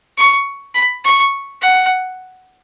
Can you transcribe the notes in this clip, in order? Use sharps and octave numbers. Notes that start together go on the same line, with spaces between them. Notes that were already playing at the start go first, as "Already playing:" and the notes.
C#6
B5
C#6
F#5